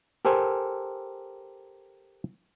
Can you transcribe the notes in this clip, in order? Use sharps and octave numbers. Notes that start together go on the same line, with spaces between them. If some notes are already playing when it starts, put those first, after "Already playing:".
G4 A4 A#4 C5 G#5